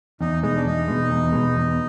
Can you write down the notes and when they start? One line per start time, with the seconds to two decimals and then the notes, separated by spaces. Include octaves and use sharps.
0.21 E2 D#4
0.43 B2 G#3 D#4
0.56 D4
0.65 E2 D#4
0.88 B2 G#3
1.10 E2
1.32 B2 G#3
1.56 E2